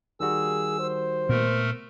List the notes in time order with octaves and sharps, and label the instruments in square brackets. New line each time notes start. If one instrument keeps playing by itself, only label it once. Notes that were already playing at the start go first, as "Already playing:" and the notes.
[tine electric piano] D#3 G3 F#4 [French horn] G#4 [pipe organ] E6
[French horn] C5
[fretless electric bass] A#2 B3 [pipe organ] A3 A#4